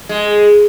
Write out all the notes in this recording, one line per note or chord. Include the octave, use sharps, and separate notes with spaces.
G#3